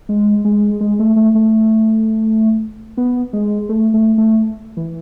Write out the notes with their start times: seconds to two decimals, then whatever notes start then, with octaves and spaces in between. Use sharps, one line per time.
0.09 G#3
0.45 G#3
0.81 G#3
0.99 A3
1.16 A3
1.35 A3
2.97 B3
3.33 G#3
3.69 A3
3.94 A3
4.18 A3
4.77 E3